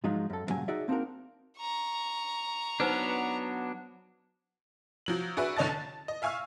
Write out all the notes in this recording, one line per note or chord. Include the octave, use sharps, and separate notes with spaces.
G#2 F3 F#3 G#3 D#4 F4
F#2 A4
E2 G2 A#2 C#3 F#3 G#5
D#4 F#4 G#4 D5 E5
A#3 C4 D4 D#4 F#4 A#4
A#5 C#6
F#3 B3 D4 D#4 B4 C5
F3 F#3 F#7
D4 F#4 G#4 B4 E5
F#1 D3 C#5 D#5 A5 A6
A5
D#5
E5 F5 G#5 C#6 E6 F6